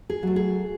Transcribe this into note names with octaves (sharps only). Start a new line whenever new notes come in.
G#4
F#3 A3
G#4